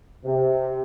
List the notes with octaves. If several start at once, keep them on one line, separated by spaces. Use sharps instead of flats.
C3